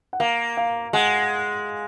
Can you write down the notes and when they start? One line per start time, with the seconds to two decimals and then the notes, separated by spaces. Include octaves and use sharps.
0.13 F#5
0.20 A#3 F5
0.57 F5
0.93 G#3 F#5